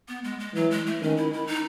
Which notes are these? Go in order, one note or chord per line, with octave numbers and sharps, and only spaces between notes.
B3
G#3
G#3
E3 F#3
G#3
A3
D#3 C#4
E4
E4
D#4